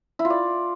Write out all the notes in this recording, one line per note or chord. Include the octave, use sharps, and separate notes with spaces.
E4
F4
D5